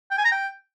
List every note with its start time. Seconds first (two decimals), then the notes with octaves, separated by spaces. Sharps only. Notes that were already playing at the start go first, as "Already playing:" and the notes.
0.11 G5
0.18 G#5
0.25 A#5
0.32 G5